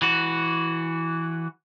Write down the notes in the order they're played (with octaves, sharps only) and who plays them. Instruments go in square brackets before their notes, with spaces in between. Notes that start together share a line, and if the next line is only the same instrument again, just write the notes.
[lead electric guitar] E3 F#4